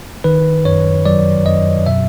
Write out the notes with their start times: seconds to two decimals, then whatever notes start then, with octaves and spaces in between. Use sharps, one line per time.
0.24 D#3 B4
0.65 F#2 C#5
1.05 F#3 D5
1.46 F#2 D#5
1.86 B2 E5